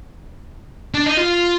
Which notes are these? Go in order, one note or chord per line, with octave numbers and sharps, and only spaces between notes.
D4
D#4
F4